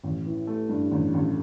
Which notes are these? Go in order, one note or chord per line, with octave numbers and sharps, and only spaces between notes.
A1
E3
A3
G2
A1
A1